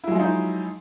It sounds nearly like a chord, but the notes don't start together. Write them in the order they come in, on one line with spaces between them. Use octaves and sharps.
E4 F#3 G#3 F3 D#4